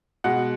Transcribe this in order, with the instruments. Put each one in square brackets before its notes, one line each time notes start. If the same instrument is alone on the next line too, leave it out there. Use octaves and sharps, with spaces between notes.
[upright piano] B2 G#3 F#5